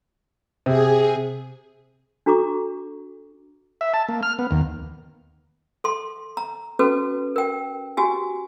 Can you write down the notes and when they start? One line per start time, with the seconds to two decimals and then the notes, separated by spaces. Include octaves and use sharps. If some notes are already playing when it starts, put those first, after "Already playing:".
0.66 C3 G#4
2.26 D4 F#4 A4 A#5 C#6 D6
3.81 E5
3.94 A5
4.09 A#3
4.23 F6
4.39 B3
4.51 D#2
5.84 A4 C6
6.37 A#5
6.79 C#4 F#4 A4 B4
7.36 A#4 G5
7.97 F#4 G4 G#5